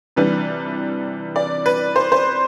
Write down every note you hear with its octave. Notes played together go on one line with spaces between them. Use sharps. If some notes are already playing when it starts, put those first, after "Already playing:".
C3 E3 G3 D4 B4
D5
B4
C5
C5